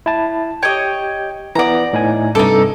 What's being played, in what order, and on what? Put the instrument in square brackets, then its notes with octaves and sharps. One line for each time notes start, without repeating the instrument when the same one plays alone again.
[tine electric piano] E4 A5
[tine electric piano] G4 G5 [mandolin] C#5 D#5
[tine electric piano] E3 B3 [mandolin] D5 A#5
[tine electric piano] A2 D#4 G#5
[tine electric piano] G2 C3 D6 [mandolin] D#4 A4